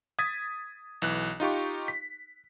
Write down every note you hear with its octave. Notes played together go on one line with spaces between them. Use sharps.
D#6 G#6 A6 B6
B1 E3 F#6
D#4 F4 G4 C#6
B6